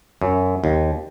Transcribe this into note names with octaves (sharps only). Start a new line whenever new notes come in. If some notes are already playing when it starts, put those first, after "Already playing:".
F#2
D#2